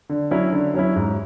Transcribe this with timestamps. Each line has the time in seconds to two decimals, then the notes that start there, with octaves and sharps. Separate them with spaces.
0.09 D3
0.31 F#3 C#4 E4
0.52 D3
0.74 F#3 C#4 E4
0.96 G#2